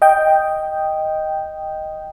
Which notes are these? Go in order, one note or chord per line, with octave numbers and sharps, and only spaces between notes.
D#5 G5